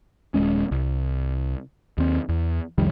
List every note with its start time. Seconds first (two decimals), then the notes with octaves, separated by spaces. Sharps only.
0.34 D#1 D#2 G#3 C#4
0.71 C2
1.98 D#2 C4
2.29 E2
2.78 C2 F2 D#3 G3